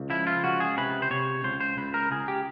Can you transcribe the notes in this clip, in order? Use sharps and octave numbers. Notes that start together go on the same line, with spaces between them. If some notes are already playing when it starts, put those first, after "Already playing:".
Already playing: C#2
F3 E4
F4
C#2 F#4
G#4
C3 B4
C5
C3 C#5
C#2 C5
C5
C#2 B4
A#4
C#2 G#4
G4